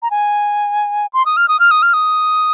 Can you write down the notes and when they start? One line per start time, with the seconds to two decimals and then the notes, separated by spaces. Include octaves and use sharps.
0.02 A#5
0.11 G#5
1.13 C6
1.26 D#6
1.37 F6
1.48 D#6
1.60 F6
1.71 D#6
1.82 F6
1.93 D#6